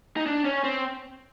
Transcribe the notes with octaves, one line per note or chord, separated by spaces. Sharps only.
D#4
D4
C#4
C4